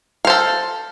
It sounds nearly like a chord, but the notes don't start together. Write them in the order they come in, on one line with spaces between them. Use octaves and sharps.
F5 C5 A4